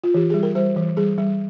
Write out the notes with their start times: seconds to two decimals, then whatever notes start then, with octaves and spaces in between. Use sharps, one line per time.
0.04 F4
0.14 E3 G4
0.30 G3 G#4
0.43 A#4
0.55 G3 C5
0.77 E3
0.97 G3 G#4
1.18 G3